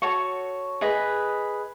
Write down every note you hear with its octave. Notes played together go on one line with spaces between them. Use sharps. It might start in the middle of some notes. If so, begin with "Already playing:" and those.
F#4 A4 C#5 C#6
G#4 B4 D#5